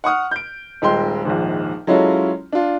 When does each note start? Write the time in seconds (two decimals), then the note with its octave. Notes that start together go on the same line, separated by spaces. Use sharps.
0.04 F#5 C#6 D#6 F6
0.31 G6 D7
0.82 D#1 G#3 G5 C6
1.25 A#1 D#2 G#2
1.87 F#3 G#3 C#4 E4 F4 A4
2.53 D4 F4